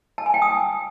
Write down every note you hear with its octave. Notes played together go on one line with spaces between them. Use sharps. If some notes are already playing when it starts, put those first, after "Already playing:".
A5
G#5
G5
D#6